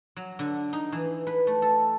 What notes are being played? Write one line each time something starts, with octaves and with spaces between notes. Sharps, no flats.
F#3
D3
D#4
E3
B4
A3
A4